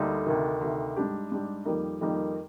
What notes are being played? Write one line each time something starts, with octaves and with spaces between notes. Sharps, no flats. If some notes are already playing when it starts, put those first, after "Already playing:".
Already playing: D2 D3 G3 A#3 D#4
D2 C3 D#3
D2 C3 D#3
G#2 G3 D4 G4
G#2 G3 D4 G4
F2 D#3 G3 A#3 D#4
F2 D#3 G3 A#3 D#4